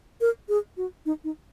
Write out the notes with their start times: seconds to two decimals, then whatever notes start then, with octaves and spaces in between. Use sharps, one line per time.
0.21 A#4
0.49 G#4
0.77 F#4
1.06 D#4
1.24 D#4